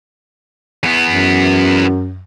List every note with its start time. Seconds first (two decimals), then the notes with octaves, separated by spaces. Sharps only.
0.83 E2 B3
1.10 F#2